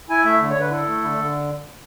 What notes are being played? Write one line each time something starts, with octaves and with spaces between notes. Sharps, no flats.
E4 G#5
A3 E5
D3
C#5
D3 B4
E4 A4
A3
D3
D3